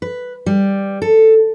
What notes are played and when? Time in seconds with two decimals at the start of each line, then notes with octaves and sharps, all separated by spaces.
0.02 B4
0.46 G3
1.02 A4